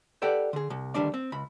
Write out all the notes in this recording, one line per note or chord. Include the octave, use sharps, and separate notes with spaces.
G4 A4 B4 D5 F#5 G5
D3 G#4
C2
D2 D#3 G3 D4 D5
C4
C#2 B5